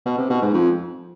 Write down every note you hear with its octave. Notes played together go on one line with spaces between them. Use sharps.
B2
C3
B2
G#2
F2